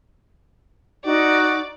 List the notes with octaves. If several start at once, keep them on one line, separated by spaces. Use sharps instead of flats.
D#4 F#4 D5